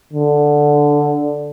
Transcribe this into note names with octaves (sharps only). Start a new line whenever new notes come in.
D3